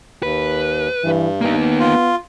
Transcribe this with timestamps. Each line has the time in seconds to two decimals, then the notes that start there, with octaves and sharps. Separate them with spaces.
0.23 D#2 B4
1.03 G2 E3
1.41 A#3 B3 D#4
1.80 F4